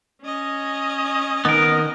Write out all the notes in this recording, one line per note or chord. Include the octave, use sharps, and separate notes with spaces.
C#4 D#5
D#3 B3 A#4